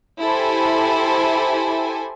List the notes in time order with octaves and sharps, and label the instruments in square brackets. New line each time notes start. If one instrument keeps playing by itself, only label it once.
[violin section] E4 G4 A4 C5 G#5